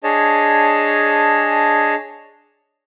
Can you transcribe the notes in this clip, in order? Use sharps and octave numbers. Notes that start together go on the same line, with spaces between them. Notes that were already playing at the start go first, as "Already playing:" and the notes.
D4 G#4 C#5 D#5 A5